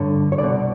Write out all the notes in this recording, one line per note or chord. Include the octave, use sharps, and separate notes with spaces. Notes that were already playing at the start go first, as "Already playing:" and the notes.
Already playing: G2 D3 C#5
C#5
C2 B2 D5